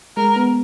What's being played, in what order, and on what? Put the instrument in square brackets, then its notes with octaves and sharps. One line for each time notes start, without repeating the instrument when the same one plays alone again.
[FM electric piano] G#3 [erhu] A#4
[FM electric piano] B3